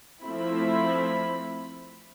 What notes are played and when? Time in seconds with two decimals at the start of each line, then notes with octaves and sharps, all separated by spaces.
0.23 F3 A3 C4 E4 B5